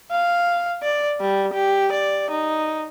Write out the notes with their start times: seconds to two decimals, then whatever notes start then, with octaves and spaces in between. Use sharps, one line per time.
0.11 F5
0.83 D5
1.20 G3
1.53 G4
1.92 D5
2.30 D#4